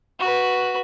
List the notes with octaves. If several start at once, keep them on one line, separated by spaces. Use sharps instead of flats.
F#4 B4